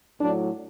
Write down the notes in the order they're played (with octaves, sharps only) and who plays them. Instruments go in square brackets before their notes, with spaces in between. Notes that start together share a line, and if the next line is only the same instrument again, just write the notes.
[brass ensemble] A2 F#3 D4